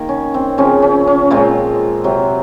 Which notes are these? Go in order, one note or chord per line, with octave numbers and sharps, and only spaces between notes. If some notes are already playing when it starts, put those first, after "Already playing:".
Already playing: D#3 A#3
C#4
C4
C#3 F3 C4 C#4
C#4
C#4
A#2 G#3 C4 F4
C3 F#3 C4